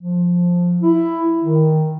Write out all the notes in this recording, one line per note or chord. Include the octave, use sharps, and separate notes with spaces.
F3
E4
D#3